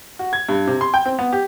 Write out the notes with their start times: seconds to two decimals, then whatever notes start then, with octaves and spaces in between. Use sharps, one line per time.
0.19 F#4
0.33 G#6
0.49 G2
0.67 C3
0.81 C6
0.94 G5
1.06 C4
1.19 B3
1.33 G4